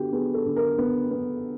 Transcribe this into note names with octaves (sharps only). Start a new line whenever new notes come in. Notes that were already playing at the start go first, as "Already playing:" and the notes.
Already playing: D3 B3 F#4 G4
B3 G#4
A4
D3
A#4
B3
B3